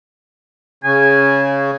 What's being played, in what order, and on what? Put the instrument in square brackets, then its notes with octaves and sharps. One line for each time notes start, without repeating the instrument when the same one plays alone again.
[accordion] C#3 [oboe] G#5